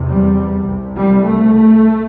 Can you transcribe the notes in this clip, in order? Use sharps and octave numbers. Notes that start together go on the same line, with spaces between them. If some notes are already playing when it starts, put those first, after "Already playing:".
Already playing: E2 C3
G3
C2 C3
G3
A3